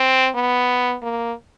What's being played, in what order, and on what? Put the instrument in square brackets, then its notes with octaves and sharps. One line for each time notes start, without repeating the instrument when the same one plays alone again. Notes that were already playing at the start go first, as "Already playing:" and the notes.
Already playing: [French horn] C4
B3
A#3